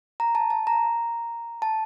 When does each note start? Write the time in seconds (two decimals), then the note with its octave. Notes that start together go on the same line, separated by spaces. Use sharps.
0.20 A#5
0.35 A5
0.50 A5
0.67 A#5
1.62 A5